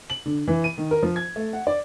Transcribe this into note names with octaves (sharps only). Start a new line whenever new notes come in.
F#7
D3
E3
D#7
D#3
A#4
F3
G#6
A3
F#5
D5